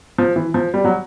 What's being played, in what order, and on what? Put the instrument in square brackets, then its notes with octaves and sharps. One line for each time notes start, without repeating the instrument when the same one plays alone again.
[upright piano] F3
E3
F3
G3
F#3